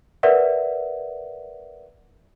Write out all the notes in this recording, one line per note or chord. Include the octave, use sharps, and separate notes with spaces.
A#4 B4 D5 E5 F#5